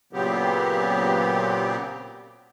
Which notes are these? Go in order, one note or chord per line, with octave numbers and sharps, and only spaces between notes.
A#2 C#3 F#3 B3 C4 G4